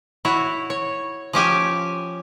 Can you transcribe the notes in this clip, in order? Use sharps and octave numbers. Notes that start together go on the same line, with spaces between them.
E4 F#4 C#5
C#5
F3 C#4 G4 G#5